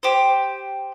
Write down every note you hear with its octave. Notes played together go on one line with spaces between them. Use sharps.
G4 C5